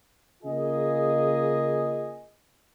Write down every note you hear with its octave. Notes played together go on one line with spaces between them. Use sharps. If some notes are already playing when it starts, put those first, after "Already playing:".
C#3 A#3 F4 G#4 D#5